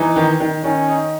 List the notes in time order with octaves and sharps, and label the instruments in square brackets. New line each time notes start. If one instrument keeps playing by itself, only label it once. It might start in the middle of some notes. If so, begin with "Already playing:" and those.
Already playing: [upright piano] E3 [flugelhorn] D#4
[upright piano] D#3
D#3
[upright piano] D#3 [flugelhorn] C#4
[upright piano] D#4